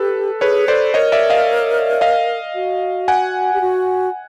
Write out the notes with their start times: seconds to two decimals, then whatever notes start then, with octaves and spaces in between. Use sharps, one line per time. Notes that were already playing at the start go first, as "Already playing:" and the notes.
Already playing: G4 A4 B4
0.41 G#4 B4 C#5
0.68 A4 C5 D5
0.94 A#4 C#5 D#5
1.12 D5 E5
1.30 D#5 F5
2.01 D#5 F5
2.55 F#4
3.08 F#5 G#5
3.54 G4
3.61 F#4